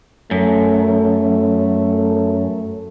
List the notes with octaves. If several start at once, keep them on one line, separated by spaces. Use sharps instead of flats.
F#2 A3